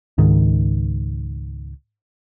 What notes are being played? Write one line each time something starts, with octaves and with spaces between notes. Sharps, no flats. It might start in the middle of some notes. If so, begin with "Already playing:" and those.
C#2 G#2 D#3